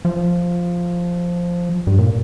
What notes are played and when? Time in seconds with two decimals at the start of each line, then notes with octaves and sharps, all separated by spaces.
0.05 F3
1.87 G2
1.98 A#2